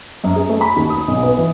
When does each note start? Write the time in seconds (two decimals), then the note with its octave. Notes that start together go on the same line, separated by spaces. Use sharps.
0.24 F#2
0.36 G#4
0.49 A3
0.61 B5
0.76 D#2
0.90 D#6
1.08 B1
1.23 B3
1.38 E3